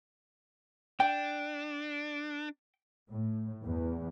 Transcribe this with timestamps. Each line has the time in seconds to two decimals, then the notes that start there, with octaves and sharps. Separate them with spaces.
1.00 D4 G5
3.09 A2
3.64 E2